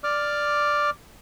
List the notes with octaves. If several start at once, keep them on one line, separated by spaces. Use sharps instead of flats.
D5 D6 F6